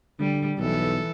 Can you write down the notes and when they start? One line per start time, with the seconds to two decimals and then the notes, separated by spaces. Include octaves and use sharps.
0.20 D3 G3
0.58 B1 E3 A4